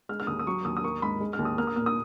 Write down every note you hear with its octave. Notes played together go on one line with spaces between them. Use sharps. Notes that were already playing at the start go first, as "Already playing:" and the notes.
G#3 F6
F6
D#2 D#6
D#6
F#3 C#6
D#2 D#6
D#6
A#3 C#6
G#2 B5
G#3
F6
D#2
D#6
A#3 F6
D#6
A#2 F6
D#6